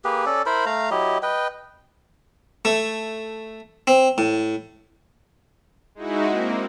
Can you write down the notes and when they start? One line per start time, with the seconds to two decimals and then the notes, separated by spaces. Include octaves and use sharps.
0.04 A#3 G4 G#4 B4
0.26 C#4 A4 D5
0.46 E4 A#4 C5 B5
0.66 A3 F5 A#5
0.91 F#3 E4 G4 D#5
1.23 B4 D#5 G5
2.65 A3
3.87 C4
4.18 A2
5.95 G#3 D#4 E4 F#4
6.28 A#3 C4